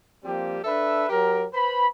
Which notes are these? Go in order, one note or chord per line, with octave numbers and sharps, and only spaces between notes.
F3 G3 A#3 C4 G4
D4 A4 B4 E5
F#3 G4 A#4
B4 C5 B5